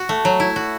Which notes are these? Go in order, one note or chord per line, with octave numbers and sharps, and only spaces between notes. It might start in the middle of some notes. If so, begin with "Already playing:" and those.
Already playing: F#4
A3
F#3
E4
F#4